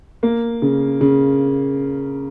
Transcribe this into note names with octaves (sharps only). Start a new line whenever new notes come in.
A#3
C#3
C#3